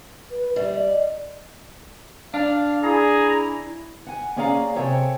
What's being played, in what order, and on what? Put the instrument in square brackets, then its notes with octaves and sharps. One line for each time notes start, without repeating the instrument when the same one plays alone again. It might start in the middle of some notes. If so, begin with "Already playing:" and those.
[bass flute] B4
[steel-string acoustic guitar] G3 [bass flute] E5
[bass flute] D#5
[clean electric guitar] D4 [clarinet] F5
[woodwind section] E4 [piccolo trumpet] G#4 [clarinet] A#5
[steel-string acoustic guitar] F#5 G#5
A#3 C#4 G#4 D5 F5 A#5
C3 G#4 A4 C#5 G5